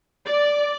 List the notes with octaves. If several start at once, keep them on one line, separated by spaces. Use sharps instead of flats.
D5